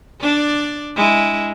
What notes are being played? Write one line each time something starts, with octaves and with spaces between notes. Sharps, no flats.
D4 D5
G#3 E4